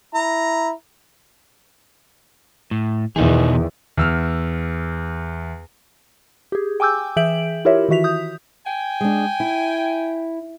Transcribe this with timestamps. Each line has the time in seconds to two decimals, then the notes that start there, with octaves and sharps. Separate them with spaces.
0.15 E4 A#5
2.71 A2
3.16 E2 B2 D#3 D#4 G#4
3.97 E2 E6 F6
6.52 G4 G#4
6.80 G5 G#5 D6 E6 G6
7.17 E3 G#4 E5 G6 D7 F#7
7.65 E4 F4 G4 A#4 C#5 E5
7.89 D#3 E3 F#4 E5 B6 F7
8.04 D#6 G6
8.66 G5 G#5
9.01 G#3 D4
9.40 E4